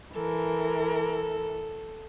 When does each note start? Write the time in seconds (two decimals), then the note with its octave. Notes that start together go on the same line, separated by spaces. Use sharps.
0.14 E3 A4 A#4